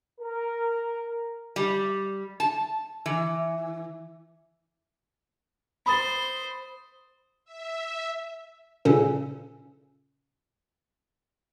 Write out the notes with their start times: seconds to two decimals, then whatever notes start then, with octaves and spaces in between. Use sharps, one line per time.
0.19 A#4
1.56 G3
2.40 A5
3.06 E3
5.86 C5 B5 D#6 A6
7.45 E5
8.85 A#2 C#3 C#4 A4